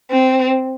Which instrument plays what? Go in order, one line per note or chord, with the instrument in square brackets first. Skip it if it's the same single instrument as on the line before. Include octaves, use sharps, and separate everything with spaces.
[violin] C4